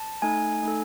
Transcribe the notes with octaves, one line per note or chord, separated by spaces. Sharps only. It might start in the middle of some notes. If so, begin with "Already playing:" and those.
Already playing: A5
A3 D#4 A4 G#5
A3 D#4 A4